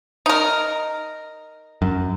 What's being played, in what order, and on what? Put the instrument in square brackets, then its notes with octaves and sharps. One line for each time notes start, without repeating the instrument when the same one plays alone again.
[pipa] D#4 A#4
[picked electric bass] F#2